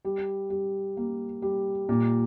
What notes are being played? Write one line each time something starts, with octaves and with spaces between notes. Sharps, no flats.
G3
G3
A#3
G3
A#2